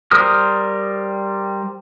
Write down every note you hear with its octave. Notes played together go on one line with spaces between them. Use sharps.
G3 A#4 C5 D#6 F6